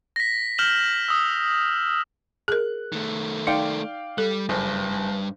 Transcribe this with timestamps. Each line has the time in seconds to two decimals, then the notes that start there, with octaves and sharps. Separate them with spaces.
0.16 A#6 B6
0.58 F6 G6 E7 F#7
1.08 D#6 E6
2.48 G#4 A#4 F#6
2.93 D#3 A3
3.47 D#4 D5 F5 G5
4.18 G3 A4
4.49 F#1 G2